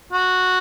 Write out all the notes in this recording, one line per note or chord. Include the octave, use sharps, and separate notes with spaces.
F#4